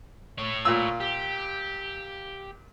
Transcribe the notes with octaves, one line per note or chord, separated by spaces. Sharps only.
A2 C#5
A#2 F4 E6
G4